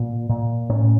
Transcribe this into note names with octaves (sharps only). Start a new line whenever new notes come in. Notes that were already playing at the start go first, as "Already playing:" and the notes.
Already playing: A#2
A#2
A2 C#4